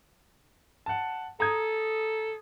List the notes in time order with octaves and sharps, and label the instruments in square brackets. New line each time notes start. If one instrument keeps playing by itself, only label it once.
[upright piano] F#5 A5
[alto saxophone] A4 [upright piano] A#5 D#6 G#6